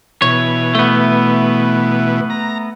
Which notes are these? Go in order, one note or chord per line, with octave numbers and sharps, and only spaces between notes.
B2 E3 C#5
A3 B3
A#5